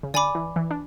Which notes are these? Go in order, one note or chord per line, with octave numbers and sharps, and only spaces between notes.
C#3
D3 D5 G#5 B5 D6
E3
E3
D4